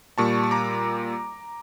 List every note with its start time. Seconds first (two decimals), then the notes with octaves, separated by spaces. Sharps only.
0.18 A#2 G3 A5 C#6
0.44 C#6
0.51 A#5 D6